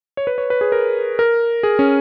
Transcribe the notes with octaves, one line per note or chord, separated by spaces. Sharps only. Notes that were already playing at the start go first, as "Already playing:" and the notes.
C#5
B4
C#5
B4
G#4
A#4
A#4
G#4
C#4